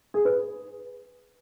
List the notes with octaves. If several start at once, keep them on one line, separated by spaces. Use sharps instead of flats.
G#4
B4